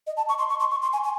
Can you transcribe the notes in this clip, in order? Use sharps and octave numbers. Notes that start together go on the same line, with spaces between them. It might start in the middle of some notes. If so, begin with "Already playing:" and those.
D#5
A5
C#6
C6
C#6
C6
C#6
C6
G#5
G#5